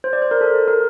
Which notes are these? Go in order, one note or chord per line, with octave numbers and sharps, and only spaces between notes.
C5
D5
C5
A#4
A4
A#4